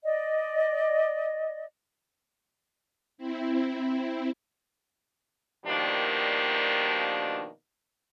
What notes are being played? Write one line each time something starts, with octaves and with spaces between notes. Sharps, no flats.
D5 D#5
C4 E4
B2 D#3 F3 G3 A#3 D4